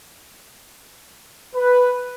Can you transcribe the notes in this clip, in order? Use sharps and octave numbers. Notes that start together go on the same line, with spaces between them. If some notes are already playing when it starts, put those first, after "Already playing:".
B4